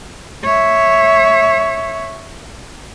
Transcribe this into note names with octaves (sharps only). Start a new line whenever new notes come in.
C#5 E5